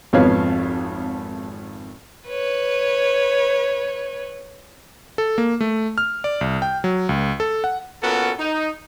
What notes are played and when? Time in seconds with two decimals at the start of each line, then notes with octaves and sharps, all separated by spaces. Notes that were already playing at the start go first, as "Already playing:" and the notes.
0.13 G#1 F2 B3 C#5 F5
2.28 B4 C#5
5.18 A4
5.38 A#3
5.60 A3
5.98 F6
6.24 D5
6.41 C2
6.62 G5
6.84 F#3
7.09 C#2
7.40 A4
7.64 F#5
8.03 A#2 B3 C#4 F#4 A4 A#4
8.39 D#4